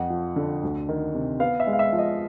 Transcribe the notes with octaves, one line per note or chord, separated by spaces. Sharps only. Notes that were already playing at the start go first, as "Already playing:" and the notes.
Already playing: F2 F#5
F3
D3
D2
D#3
C3
B3 F5
E5
G#3
F5
E5
F3
D#5